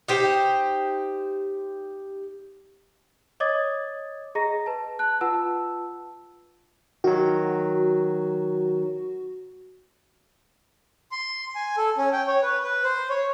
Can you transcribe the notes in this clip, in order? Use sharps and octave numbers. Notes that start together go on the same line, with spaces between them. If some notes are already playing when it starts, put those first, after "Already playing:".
D#4 G4 C5
C#5 D#5 D6 D#6 G#6 A6
G#4 D#5 A#5 A#6
B4 A5
A5 F#6
F4 B4 F#5 A5 E6
D#3 F#3 F#4
C6
G#5
A4
C#4
G5
C#5
B4
B4
C5
C#5